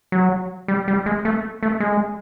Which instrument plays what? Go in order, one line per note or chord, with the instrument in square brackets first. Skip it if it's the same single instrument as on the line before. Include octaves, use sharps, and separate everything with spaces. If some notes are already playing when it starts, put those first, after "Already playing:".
[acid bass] F#3
G3
G3
G#3
A3
A3
G#3